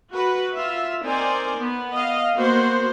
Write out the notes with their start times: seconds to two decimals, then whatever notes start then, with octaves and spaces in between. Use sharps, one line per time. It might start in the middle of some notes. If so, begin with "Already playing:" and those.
0.13 F#4 B4
0.54 F4 E5
1.04 C4 D#4 A#4 C5 D5 G#5
1.56 B3
1.93 D#5 F5
2.35 A#3 B3 F#4 C5